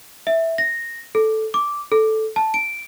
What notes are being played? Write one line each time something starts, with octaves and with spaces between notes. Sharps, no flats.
E5
A#6
A4
D6
A4
A5
D7